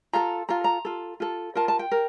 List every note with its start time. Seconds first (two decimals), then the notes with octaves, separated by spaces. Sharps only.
0.13 F4 A4 A#5
0.49 F4 A4 A#5
0.64 A#5
0.85 F4 A4
1.20 F4 A4
1.55 F4 A#4 A5
1.68 A5
1.79 G5
1.92 A#4